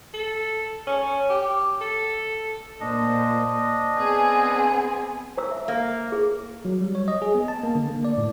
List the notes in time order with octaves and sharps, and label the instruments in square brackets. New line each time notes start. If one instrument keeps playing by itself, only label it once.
[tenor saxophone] A4
C#4
G4
A4
[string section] A#2 C5 [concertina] D4 D#5
[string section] B3 C4 G#4
[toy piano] C5 A#5 E6
E5
[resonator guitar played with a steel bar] A#3
[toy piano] G#4
[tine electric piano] F#3
G3
C#5
D#5
G#4
B3
A5
A#3
D3
A#3
D5
A2